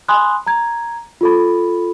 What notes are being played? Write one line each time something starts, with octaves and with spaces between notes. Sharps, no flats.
G#5 B5 C6 D#6 F#6
A#5 G#6
F4 A4 B5